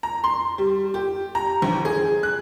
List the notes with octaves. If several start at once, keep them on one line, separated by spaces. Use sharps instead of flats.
A#5
C6
G3
G4
A#5
A#1
G#4
F#6